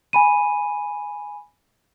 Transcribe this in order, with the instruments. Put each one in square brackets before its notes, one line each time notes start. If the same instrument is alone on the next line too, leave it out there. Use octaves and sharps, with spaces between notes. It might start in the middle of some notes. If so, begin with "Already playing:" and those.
[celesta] G#5 B5 D#7